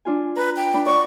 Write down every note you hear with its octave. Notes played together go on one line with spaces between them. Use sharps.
D4 F4 G#5
B4 A#5
G5
D4 B5
D5 F#5 C#6 D6